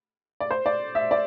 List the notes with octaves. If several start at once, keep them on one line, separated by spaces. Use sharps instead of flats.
D5
C5
D5
E5
D5